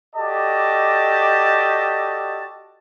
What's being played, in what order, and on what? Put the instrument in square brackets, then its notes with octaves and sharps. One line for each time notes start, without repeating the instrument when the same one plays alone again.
[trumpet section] F#4 G4 A4 D5 D#5 A5